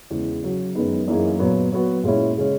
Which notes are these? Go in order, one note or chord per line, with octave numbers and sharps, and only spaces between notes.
E2 C#3 G#3
C#3 F#3 C#4 F#4
F#2 D#3 G#3 B3 D#4
F#2 E3 A#3 D#4 G#4
A#2 F#3 B3
F#3 B3 F#4
A#2 G#3 C#4 E4
C#3 G#3 C#4